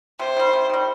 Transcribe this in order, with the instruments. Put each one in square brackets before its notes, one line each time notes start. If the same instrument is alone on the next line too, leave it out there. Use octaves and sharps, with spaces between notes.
[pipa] C3 [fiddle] C5
[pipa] D#3 G3
C3
D#3 G3